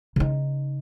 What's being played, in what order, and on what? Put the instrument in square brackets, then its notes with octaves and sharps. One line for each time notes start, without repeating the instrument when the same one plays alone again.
[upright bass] C#3 D#4